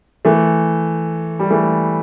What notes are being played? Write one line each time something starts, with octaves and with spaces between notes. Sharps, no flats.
E3 A3
G3
E3 A3